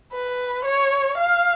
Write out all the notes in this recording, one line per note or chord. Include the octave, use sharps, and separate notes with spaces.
B4
C#5
F5